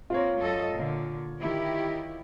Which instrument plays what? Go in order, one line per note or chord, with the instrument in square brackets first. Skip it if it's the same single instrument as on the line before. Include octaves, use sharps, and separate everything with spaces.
[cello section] A#3 C4 [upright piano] F4 C#5
[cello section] F#2 A4 D#5
A#2 D3
D#3 E4 G4